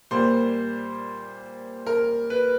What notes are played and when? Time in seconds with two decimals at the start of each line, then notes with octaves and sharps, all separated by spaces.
0.11 A#2 G3 A#3 C5
1.87 A#4
2.30 B4